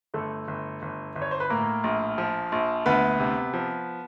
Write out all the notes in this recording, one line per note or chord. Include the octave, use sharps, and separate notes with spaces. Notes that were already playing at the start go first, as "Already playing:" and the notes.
G1 A3 A4
G1
G1
G1
C#5
C5
B4
A2 A#3 A#4
A#1
F3
A#1
D2 B3 B4
C3
F3